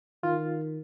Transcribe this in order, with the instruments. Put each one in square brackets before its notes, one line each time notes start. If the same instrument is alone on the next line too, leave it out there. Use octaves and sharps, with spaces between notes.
[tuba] D#3 [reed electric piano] F4